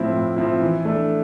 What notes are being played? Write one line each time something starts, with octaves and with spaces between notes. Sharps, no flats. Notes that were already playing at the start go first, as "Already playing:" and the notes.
Already playing: A2 F3 C4 E4
A2
F3 C4 E4
E3
A3 D4